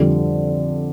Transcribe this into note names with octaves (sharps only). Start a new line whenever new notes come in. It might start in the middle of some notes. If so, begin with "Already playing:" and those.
Already playing: F2 D3 G3